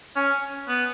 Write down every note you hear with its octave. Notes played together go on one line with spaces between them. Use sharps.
C#4
B3